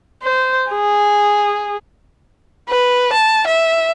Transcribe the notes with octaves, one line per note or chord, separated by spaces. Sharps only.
C5
G#4
B4
A5
E5